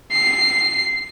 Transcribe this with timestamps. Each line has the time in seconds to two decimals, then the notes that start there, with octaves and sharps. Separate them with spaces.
0.12 C7